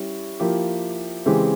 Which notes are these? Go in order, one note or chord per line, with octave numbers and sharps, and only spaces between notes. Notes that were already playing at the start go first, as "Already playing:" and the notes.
Already playing: G3 C#4 E4
F3 A#3 E4 G4
C#3 E3 G#3 C4 G4